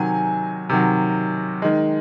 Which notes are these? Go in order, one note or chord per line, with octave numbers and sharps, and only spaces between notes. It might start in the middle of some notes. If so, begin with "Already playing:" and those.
Already playing: C3 D#3 F#3 G#5
C3 D#3 F#3
D#3 G#3